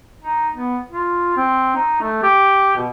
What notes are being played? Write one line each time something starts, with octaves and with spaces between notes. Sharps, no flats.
D#4
B3
F4
C4
D#4
A3
G4
B2